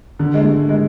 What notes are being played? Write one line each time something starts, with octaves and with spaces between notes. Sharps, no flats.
D3
G#3
A3
G#3